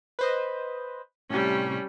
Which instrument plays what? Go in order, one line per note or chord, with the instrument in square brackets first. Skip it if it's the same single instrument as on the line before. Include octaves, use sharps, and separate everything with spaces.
[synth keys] B4 C5 D#5
[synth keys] A2 C3 [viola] G3 C#4